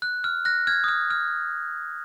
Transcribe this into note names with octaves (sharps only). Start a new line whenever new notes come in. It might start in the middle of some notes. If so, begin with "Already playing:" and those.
F#6
F6
F#6 A#6
F6 G#6
D#6
F6
F6